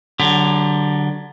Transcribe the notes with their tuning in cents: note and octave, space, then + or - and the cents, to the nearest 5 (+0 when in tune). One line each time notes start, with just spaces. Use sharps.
D3 +0 F#3 +20 G4 +35